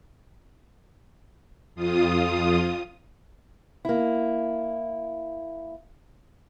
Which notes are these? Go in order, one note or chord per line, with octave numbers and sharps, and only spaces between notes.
F2 F4 D#6
A#3 E4